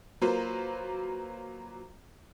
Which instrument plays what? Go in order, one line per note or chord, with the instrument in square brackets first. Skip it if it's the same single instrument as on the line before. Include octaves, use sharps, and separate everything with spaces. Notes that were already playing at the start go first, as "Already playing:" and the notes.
[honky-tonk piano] F#3 A#3 F4 B4 C5